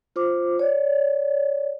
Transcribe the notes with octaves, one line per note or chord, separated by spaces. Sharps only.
F4 C5 D6
C#5 D5